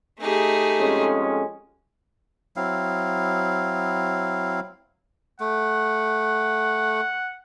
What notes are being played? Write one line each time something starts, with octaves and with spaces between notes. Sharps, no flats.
A3 D#4 G4 G#4
F2 G#3 C#4
F#3 C4 E4 F5
A3 F#5